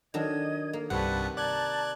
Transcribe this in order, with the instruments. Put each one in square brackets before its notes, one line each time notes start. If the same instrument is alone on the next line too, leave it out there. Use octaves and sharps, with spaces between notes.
[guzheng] D#3 F#3 D4 [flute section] D#5 G#6
[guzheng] A#3
[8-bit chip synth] C2 G2 F#5 [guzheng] C3 [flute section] B4 A5 C#6
[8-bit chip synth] D5 F#6 G#6 [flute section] A5 A#5